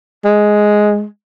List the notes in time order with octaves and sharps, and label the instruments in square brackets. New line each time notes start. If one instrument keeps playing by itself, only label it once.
[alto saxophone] G#3